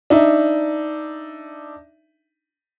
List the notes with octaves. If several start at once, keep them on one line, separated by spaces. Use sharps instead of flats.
D4 D#4 E5